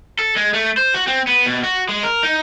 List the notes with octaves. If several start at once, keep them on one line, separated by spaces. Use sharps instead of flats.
A4
G#3
A3
C5
F#4
C4
B3
B2
F#4
G#3
A#4
D#4